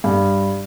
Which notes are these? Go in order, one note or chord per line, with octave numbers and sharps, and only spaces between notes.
G2